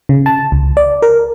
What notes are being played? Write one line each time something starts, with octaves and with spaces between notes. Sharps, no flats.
C#3
A5
C#2
D5
A#4